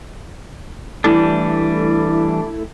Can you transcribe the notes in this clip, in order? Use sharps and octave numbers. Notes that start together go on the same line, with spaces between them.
E3 G3 A3 D4 E4 A4